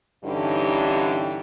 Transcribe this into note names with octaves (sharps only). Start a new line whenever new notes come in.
G2 D3 E3 C#4 D#4 G4